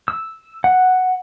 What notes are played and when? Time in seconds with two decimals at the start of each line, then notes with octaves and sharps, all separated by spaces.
0.08 E6
0.64 F#5